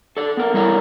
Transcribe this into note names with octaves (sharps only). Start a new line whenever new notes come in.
A4 D5
B3 A#4
G3 E4 A4 A#4 C#5 D5